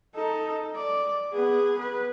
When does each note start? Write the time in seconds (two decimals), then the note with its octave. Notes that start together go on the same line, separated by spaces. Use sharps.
0.15 D#4 A4
0.75 D5
1.32 B3 G#4
1.79 B4